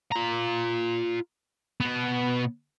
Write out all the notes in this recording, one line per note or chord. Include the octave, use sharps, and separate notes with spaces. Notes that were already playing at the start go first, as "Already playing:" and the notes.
F4 A#5
B2 B3